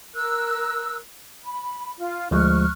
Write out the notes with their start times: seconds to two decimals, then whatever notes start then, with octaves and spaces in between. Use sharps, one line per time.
0.15 A#4 E6 F#6
1.44 B5
1.98 F4
2.31 D2 F3 G#3 C#6 F6 F#6